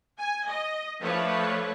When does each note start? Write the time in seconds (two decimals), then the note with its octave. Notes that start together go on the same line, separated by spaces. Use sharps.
0.18 G#5
0.47 D#5
1.01 F3 A3 D4 B4 C#5